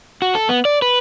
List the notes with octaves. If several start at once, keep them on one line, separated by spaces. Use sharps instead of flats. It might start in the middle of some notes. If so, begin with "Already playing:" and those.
F#4
A4
B3
D5
B4